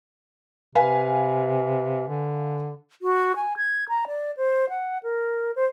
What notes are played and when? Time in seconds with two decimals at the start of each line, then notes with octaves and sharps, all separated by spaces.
0.75 C3 B4 F5 G#5
2.08 D3
3.02 F#4
3.36 G#5
3.57 G#6
3.89 A#5
4.07 D5
4.37 C5
4.69 F#5
5.03 A#4
5.56 C5